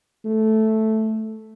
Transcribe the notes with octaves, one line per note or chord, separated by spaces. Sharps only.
A3